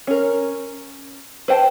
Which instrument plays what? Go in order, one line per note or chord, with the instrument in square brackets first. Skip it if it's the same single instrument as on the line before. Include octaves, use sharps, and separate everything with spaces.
[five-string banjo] C#4 A#4
B4 C5 G5 A5